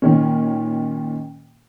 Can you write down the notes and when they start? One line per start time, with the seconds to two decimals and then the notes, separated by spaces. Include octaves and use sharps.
0.02 A#2 D#3 C#4